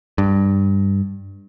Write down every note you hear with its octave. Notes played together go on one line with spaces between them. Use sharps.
G2